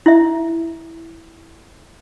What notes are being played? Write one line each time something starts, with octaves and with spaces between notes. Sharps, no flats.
E4 E5